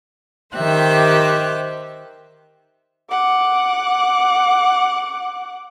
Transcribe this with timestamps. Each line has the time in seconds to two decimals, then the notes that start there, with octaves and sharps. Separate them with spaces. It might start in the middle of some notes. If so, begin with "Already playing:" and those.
0.55 D#3 G4 C5 E5 F#6
3.10 F#5 D6